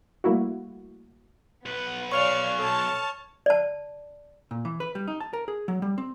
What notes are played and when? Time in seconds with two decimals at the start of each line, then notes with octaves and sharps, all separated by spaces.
0.24 G3 A3 A#3 E4 F#4
1.66 B1 B3 B4
2.12 C#5 D5 F5 G#5 C#6 F6 F7
2.59 A4 C#5 A5
3.46 D5 A5
4.51 A#2
4.65 E3
4.80 B4
4.95 G3
5.08 D#4
5.20 A5
5.33 A#4
5.48 G#4
5.68 F#3
5.82 G3
5.98 C4